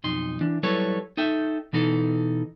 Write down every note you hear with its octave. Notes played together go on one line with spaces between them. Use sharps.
B1 F2 D#4 C6
E3 D4
F#3 G3 E4 A4 B4 C#5
D#4 A4 E5 G5
B2 E3 D#4 A4